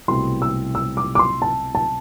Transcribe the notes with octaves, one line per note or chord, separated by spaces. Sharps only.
C2 B2 A3 C4 E4 C6
E6
E6
D6
D6
C6
A5
A5